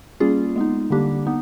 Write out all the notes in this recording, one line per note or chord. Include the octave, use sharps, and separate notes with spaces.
G3 A#3 C#4 F4 G#4
G#3 B3 D#4
D3 G3 A#3 D4 G4
B3 D#4